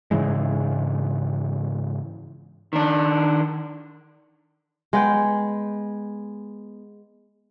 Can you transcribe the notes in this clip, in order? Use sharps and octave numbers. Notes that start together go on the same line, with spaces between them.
G#2 C#3 E3 G#3
D#3 D4
G#3 B3 G5